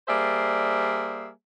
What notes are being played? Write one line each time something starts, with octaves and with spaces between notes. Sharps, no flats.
G3 A#3 G#4 C5 D5 E5